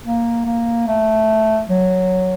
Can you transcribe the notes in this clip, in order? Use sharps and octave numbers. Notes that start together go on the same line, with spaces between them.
A#3
A#3
A3
F#3